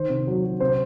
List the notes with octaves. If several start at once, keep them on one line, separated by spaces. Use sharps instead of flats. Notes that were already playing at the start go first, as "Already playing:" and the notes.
Already playing: D#3 C5
C3
F#3
F#3
C3 C5